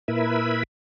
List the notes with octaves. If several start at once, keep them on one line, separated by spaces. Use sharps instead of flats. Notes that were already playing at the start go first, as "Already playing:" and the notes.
A#2 E4 A#4 B4 E5 B5